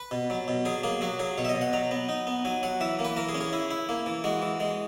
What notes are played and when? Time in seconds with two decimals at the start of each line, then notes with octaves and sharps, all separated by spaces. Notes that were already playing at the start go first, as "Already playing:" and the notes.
Already playing: B4
0.11 B2
0.30 F#3
0.48 B2
0.65 F#3 G#4
0.83 A#3 G#4
1.01 F#3 F#4
1.19 F#3 G#4
1.38 B2 C#5
1.45 E5
1.49 D#5
1.55 B2
1.61 F#5
1.73 F#3 A#5
1.91 B3
2.09 D#4
2.27 B3
2.45 F#3 G#5
2.63 F#3 F#5
2.80 E3 E5
2.99 A#3
3.05 B4
3.17 E3 A#4
3.29 G#4
3.35 C#4
3.41 G#4
3.53 E4
3.71 E4
3.89 A#3
4.06 E3
4.24 G#3 F#4
4.42 E3
4.60 G#3